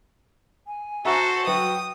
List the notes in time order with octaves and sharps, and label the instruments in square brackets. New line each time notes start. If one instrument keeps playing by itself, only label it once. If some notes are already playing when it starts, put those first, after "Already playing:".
[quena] G#5
[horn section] F#4 [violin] A4 C5 [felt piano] E5 A#5 E6
[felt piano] F#3 B4 E5 [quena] G5 [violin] D#6